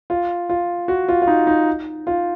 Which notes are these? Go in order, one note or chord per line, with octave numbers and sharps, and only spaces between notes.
F4
F4
F#4
F4
F4
D#4
D#4
F4